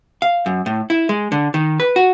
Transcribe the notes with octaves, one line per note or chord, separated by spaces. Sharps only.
F5
F#2
A2
E4
G#3
D3
D#3
B4
F#4